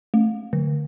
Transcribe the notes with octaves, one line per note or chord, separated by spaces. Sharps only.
A3
D3